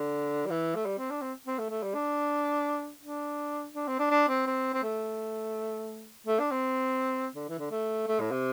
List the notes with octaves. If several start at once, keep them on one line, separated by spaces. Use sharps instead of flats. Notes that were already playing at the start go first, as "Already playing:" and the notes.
Already playing: D3
G3
E3
A3
G3
C4
D4
C4
C4
A3
A3
G3
D4
D4
D4
C4
D4
D4
C4
C4
C4
A3
A3
D4
C4
D3
E3
D3
A3
A3
A2
C3